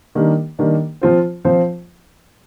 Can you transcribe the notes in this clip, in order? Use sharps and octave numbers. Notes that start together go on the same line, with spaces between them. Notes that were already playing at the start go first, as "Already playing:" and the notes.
D#3 G3 A#3 D4
D#3 G3 A#3 D4
F3 C4 F4 C5
F3 C4 F4 C5